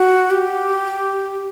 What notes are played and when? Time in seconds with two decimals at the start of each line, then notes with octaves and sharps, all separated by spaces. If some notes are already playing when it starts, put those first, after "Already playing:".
Already playing: F#4
0.30 G4